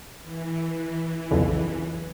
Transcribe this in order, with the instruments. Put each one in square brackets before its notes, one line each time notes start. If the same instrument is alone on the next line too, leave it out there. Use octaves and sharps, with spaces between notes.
[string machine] E3
[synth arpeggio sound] B1 F2 C#3